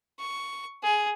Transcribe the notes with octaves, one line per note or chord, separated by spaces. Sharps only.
C#6
G#4